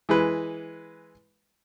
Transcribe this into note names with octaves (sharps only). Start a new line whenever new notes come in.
E3 G#3 B4